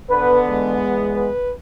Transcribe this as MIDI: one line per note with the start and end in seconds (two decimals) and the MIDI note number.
0.10 0.78 50
0.10 1.31 59
0.10 0.37 71
0.48 1.29 40
0.48 1.29 56
1.15 1.52 71